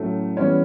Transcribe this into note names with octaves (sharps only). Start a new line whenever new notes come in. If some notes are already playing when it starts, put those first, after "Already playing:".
Already playing: A2 F#3 A3 C#4
E3 G3 B3 C#4 C#5